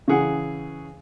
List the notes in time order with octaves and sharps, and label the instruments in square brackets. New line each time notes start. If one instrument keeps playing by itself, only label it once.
[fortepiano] C#3 E3 G#4 F#5